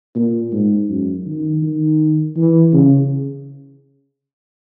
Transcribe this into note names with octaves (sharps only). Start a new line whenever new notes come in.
A#2
G#2
F#2
D#3
D#3
E3
C#3